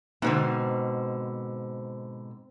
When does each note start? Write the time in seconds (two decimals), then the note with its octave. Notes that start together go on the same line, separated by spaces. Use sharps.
0.22 G#2 B2 D3 C4 C5